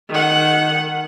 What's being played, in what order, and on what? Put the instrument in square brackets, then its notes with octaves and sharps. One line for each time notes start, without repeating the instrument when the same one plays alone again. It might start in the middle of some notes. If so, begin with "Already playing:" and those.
[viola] D#3 F#5